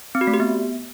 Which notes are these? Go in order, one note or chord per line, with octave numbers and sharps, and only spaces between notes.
C4
F#4
A3
G4
B3